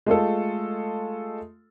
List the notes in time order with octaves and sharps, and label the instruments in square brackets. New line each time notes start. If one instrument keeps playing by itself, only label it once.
[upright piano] G#3 A3 F4 A4